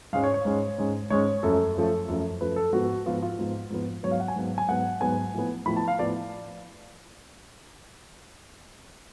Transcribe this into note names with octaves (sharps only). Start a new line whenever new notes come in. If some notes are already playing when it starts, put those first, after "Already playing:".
G#2 G#3 C#4 F5
C#5
C#5
G#2 G#3 C#4
G#2 G#3 C#4
G#2 G#3 C#4 C#5
F#2 F3 A3 A4
F#2 F3 A3
F#2 F3 A3
F#2 F3 A3 B4
A4
G#2 F3 B3 F#4
G#2 F3 B3 F4
F4
G#2 F3 B3
G#2 F3 B3
G#2 F#3 B3 C#5
F5
F#5
G#5
G#2 F#3 B3
G#5
G#2 F#3 B3 F#5
G#2 F#3 B3 G#5
A2 F3 B3
A2 F3 B3 B5
A5
F5
A2 F3 B3 D5